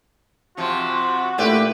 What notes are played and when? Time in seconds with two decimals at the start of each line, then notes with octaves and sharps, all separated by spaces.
0.57 C3 F3 C4 F#4
1.38 A#2 A3 D4 E4 G4 B4